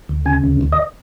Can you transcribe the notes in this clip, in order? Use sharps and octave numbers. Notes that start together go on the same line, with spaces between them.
D2
C#3 G#5
D2
D2
D#5